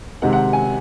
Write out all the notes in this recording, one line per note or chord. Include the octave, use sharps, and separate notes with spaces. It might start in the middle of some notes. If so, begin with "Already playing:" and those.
C3 D#3 G#3 C4 F#5
F#5
G#5